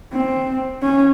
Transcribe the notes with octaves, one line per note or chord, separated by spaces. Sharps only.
C4
C#4